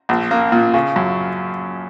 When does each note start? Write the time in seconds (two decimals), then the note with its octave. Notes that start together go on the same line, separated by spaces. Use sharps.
0.09 A#1
0.31 A#3
0.52 A#2
0.74 C#3
0.96 F#2